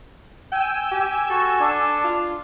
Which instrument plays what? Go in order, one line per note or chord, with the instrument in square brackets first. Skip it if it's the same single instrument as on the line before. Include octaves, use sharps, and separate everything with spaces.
[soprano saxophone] G5 [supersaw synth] G#5 E6
[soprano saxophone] G4
[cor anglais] F#4 [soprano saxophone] A4
[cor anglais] D4
[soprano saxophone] F4